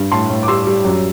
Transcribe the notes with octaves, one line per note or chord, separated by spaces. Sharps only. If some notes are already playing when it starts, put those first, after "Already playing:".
Already playing: G2
A2 A5 C6
A2
D6
G3 C6 E6
G3
F#2